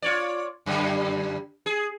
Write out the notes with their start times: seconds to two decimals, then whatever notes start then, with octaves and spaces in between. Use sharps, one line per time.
0.02 F4 C#5 D5
0.66 F#2 D3 G3
1.66 G#4